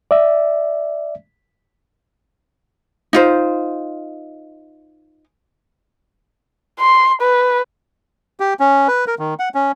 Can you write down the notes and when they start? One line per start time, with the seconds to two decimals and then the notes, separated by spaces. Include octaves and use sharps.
0.11 D5 E5
3.13 D#4 F4 C5
6.81 C6
7.21 B4
8.40 G4
8.60 C#4
8.88 B4
9.07 A#4
9.19 D#3
9.39 F#5
9.55 C#4